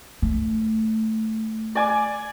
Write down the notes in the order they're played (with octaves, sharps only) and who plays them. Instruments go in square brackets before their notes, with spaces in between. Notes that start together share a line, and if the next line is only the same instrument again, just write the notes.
[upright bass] A3
[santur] D5 G#5 D6